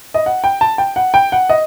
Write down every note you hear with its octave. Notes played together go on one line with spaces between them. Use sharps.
D#5
F#5
G5
A5
G5
F#5
G5
F#5
D#5